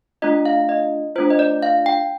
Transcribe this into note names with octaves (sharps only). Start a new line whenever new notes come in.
A3 D4 F4 D#5
F5
D#5
A3 D4 F4 C5
D#5
D5
F5
G5